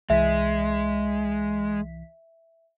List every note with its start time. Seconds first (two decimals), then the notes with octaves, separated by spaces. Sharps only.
0.10 C2 E3 G#3 E5 B6